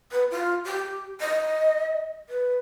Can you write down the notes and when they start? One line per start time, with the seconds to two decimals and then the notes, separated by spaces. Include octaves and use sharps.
0.12 B4
0.31 F4
0.65 G4
1.20 D#5
2.29 B4